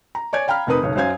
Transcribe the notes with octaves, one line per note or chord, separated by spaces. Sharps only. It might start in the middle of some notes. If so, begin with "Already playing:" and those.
A#5
C#5 D5 G#5 G#6
F5 G5 A#5 B5 F6
F1 C4 D#4 A#4 B4 D#6
F#1 B1 C#5
F#2 F#3 C5 F5 G#5 G#6